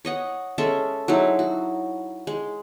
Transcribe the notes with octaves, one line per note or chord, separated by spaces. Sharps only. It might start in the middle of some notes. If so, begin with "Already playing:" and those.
C#5 D#5 F#5
G#3 C#4 A4 E5
F#3 G#3 D#4 E4
F#4
G#3